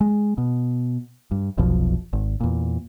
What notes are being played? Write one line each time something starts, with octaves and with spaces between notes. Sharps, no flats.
G#3
B2
G2
F1 B1 B2 F3
G#1
E2 A#2